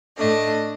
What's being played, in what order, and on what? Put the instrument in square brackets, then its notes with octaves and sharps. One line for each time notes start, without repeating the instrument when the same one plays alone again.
[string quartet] A2 A3 D4 D#5